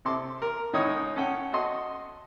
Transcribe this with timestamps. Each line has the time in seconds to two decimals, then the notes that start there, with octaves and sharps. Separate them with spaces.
0.05 C3 A4 C6 D6
0.42 A#4
0.73 C#2 D#3 D#4 C#5 D#5 D#6
1.16 C#4 A4 F#5 G5
1.53 F#4 A4 D#5 C6